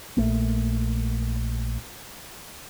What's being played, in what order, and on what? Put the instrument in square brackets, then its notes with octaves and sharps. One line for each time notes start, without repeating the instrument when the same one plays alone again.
[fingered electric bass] A#1 A3 A#3